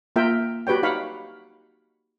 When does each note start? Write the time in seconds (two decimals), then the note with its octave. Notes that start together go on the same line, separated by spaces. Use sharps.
0.16 A#3 F4 A#4 E5 G5
0.67 F#4 G4 B4 C#5 G5
0.83 D#4 C#5 F5 F#5 B5